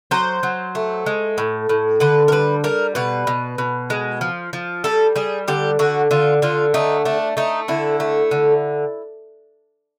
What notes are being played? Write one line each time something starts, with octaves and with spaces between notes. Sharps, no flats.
F#3 C5
F#3
A3
G#3
A2
A2
D3 B4
A#4
G3 B4
G3 A#4
B2 B4
B2
B2
G#3
F3
F3
G3 A4
G3 G#4
D3 G4
D3 F#4
D3 F4
D3 F4
A3 D#4
A3 D4
A3 D#4
D3 E4
A3
D3